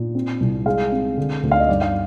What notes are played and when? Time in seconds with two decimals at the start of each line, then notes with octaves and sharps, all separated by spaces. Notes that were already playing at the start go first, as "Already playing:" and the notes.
Already playing: A#2
0.15 C4
0.41 C2
0.66 G#3 F5
0.92 C4
1.17 D3
1.43 D2
1.52 F5
1.60 D#5
1.69 G2 D5
1.81 F5